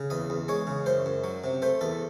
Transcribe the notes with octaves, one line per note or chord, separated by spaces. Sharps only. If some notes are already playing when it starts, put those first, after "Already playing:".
Already playing: C#3
E2 D#5
E2
G#3 C#5
C#3
F#2 C5
F#2
F#3
C3
A3 C5
E2 A4